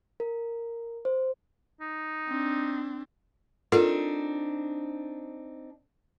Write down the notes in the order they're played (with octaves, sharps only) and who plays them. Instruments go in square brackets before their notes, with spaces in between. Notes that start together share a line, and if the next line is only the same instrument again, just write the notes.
[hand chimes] A#4
C5
[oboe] D#4
[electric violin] C4 D4
[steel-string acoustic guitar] C4 D4 D#4 [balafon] F4 A4 A#4